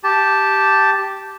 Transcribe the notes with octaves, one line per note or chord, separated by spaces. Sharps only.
G4 A5